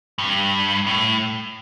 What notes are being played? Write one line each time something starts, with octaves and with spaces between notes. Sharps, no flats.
G2
A2